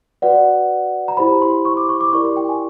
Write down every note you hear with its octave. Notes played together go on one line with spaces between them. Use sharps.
F#4 B4 D5 F#5
A#5
E4 G4 C5 B5
C6
C#6
D6
C#6
D6
E4 G4 A#4 D5 C#6
C6
G5
G#5